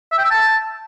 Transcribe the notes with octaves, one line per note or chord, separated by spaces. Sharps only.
E5
G5
E6
A5